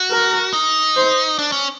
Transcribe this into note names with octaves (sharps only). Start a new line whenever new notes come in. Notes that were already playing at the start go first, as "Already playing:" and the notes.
Already playing: F#4
A#4
D#4
C5
D4
C#4